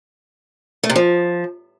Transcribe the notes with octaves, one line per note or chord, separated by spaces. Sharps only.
A3
C3
F3